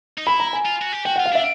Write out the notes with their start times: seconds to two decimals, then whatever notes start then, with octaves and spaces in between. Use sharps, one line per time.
0.18 D#4
0.27 E4 B5
0.40 A#5
0.53 G#5
0.66 F4
0.82 F#4
0.93 G4
1.05 F#4 G5
1.16 F4 F#5
1.26 F5
1.32 D4 E5